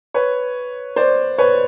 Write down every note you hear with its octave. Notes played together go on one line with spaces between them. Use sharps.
B4 C#5
C5 D5
B4 C#5